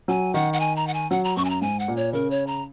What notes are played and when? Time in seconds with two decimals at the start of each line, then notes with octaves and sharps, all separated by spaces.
0.08 F#3 G#5
0.34 D#3 F#5
0.53 F#5
0.60 G#5
0.76 A#5
0.87 F#5
0.94 G#5
1.11 F#3 F#5
1.24 A#5
1.37 F#2 C#6
1.45 G#5
1.50 A#5
1.62 G#2 G#5
1.80 F#5
1.88 A#2
1.97 C#5
2.13 C#3 A#4
2.31 C#5
2.47 A#5